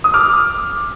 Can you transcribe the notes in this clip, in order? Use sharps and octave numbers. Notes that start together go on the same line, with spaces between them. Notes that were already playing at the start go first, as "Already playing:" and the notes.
D#6
D6 F6